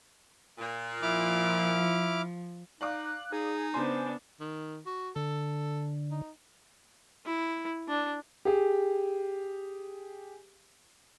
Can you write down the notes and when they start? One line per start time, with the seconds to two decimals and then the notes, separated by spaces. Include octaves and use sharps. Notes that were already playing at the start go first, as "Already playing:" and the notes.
0.58 A#2
1.02 F3 E4 D6 F6
2.81 D#4 D5 F5 D6 F#6
3.32 D#4 G#4
3.74 C#3 B3 D4 C5 G#5
4.40 D#3
4.86 F#4
5.16 D3 A4
6.11 D#4
7.26 E4
7.88 D4
8.45 G4 G#4